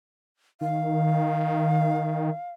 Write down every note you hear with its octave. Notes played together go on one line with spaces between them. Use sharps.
D#3 F5